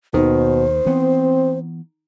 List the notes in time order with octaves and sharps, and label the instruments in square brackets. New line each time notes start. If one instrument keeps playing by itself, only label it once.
[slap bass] D#2 [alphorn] B2 [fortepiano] D#3 [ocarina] C5
[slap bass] E3 B3 [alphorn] C4